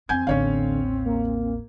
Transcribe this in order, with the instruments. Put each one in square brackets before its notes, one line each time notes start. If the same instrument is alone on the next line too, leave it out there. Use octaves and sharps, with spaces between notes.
[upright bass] F2 E3 [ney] C4 [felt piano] G#5 G6 G#6
[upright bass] A1 D#2 [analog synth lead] D3 [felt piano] C#4 C#5 F5
[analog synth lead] A#3